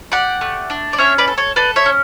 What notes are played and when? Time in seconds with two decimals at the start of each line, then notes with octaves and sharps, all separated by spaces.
0.12 G4 D5 F#5
0.41 A3
0.70 D4
0.93 D5
0.98 C#4 C#5 E5
1.18 B4 D5
1.28 A4
1.38 A4 C#5
1.56 A4 B4 D5
1.76 C#5 E5
1.86 C#4